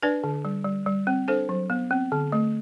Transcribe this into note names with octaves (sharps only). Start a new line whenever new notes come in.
D4 B4 D5
D3
G3
G3
G3
C4
D4 A4 C5
F#3
B3
C4
D3
A3